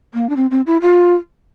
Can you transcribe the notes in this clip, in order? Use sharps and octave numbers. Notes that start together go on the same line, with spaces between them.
A#3
D4
C4
C4
E4
F4